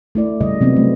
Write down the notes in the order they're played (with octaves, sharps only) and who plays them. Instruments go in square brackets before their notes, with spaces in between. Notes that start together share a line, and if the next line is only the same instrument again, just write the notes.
[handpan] A3 E4 D5
C#3 G3 D#5
C3 F#3 B3 C4
A3